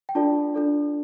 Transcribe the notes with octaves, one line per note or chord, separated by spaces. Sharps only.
G5
D4 F4 A4 D5 A5
D4 F4 A4 D5